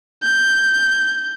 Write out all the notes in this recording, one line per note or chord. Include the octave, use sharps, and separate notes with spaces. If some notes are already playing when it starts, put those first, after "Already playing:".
G6